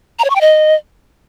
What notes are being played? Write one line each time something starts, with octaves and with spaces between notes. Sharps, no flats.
A#5
C#5
C#6
G5
D#5